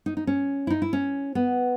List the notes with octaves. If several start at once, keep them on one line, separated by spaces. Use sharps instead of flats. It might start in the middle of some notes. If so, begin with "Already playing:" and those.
D#4
D#4
C#4
E4
D#4
E4
C#4
B3